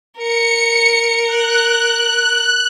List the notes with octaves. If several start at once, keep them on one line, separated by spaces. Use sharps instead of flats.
A#4 C#7
F#6